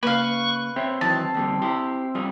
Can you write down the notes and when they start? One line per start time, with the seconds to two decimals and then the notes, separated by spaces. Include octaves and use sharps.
0.03 C#3 A#3 B4 F5 C#6
0.76 C4 C5 C#5 E5
1.01 D#3 E3 F#3 A5
1.34 D#2 D3 G3
1.62 E4 G4 C5
2.15 G3 F4 G#4